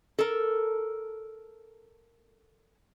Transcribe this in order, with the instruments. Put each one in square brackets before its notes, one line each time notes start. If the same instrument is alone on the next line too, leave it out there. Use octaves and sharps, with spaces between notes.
[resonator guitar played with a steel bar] A4 A#4